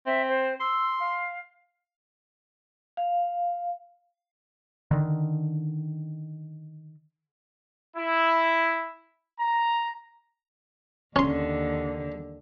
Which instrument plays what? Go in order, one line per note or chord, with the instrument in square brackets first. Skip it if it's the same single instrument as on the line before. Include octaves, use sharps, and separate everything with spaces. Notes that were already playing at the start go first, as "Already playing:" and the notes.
[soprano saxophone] C4 [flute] E5
[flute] C5
[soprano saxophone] C6 [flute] E6
[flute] F5
[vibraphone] F5
[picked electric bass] D3 D#3
[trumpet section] E4
A#5
[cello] D#2 D3 [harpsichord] C#4 C6